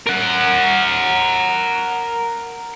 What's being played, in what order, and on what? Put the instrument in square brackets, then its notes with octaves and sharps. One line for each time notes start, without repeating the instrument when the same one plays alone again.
[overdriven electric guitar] A#4 F#5